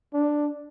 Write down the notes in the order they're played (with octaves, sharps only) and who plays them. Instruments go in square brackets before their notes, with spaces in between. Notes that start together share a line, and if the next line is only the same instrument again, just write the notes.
[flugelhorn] D4